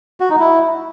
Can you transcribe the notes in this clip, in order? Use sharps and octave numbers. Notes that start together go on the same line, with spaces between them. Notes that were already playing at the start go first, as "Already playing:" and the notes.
F#4
D#4
E4